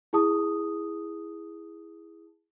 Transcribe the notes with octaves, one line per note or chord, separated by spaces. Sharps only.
E4 G#4 A5 D#6